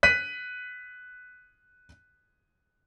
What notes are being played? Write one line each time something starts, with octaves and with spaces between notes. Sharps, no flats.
F#6 B6 D#7